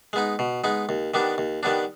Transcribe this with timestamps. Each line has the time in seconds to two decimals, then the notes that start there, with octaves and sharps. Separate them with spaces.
0.13 G#3 B3 D#4
0.39 B2
0.64 G#3 B3 D#4
0.89 D#2
1.14 D#3 G3 B3 D4
1.38 D#2
1.63 D#3 G3 B3 D4